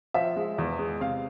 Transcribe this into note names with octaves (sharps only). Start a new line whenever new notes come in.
F3 E5
G#3
E2
G#3
C3 F5